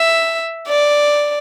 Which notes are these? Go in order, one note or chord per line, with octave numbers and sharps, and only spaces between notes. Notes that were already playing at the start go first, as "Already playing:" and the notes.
Already playing: E5
D5